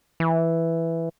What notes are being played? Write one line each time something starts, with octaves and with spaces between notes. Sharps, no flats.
E3